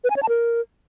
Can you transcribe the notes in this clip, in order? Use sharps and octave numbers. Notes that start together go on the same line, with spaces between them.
B4
G#5
C#5
A5
A#4